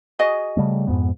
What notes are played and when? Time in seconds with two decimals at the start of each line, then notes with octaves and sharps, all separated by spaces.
0.19 F#4 G#4 D#5
0.57 C#3 G3 A3
0.87 F2 G#2 B3